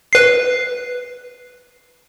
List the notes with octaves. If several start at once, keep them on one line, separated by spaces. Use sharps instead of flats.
B4 C7